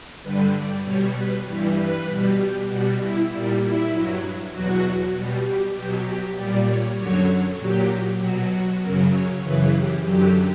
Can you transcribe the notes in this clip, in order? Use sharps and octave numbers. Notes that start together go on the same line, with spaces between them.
G2 D3 G3 B4
D5
B2 G3 C#5
B4
G2 E3 G3
B4
B2 G3
G4
B2 G3 F#4
E4
A#2 G3
E4
G2 F#3
E2 B2 F#3 F#4
B2 G3
G4
B2 F#3 G4
G4
A#2 G3 D5
C#5
F#2 D3 F#3 C#5
A#2 F#3 G4
B2 F#3 F#4
F#4
F#2 C#3 F#3 A#4
C#5
F#2 C#3 E3 B4
G4
F#2 D3 F#3 G4